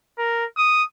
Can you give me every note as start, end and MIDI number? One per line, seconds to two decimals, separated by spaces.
0.18 0.45 70
0.57 0.83 87